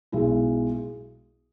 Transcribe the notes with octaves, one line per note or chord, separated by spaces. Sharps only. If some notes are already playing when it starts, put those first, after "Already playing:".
B1 B2 G#3 E4